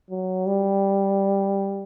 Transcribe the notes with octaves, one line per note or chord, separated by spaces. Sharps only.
F#3
G3